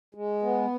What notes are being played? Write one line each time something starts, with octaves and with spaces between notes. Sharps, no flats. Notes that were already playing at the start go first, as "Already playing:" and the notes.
G#3
B3